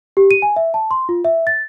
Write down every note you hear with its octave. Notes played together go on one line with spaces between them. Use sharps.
G4
D#7
G#5
E5
A5
C6
F4
E5
A6